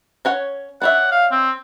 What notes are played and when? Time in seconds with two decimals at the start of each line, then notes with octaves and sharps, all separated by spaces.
0.25 C#4 C#5 F#5
0.82 D4 C#5 E5 F#5
1.11 F5
1.32 C4